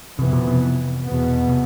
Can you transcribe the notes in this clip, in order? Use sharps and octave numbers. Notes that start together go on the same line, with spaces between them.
F2 C3 E3 B3
B2
C3
E2 B2 B3
C3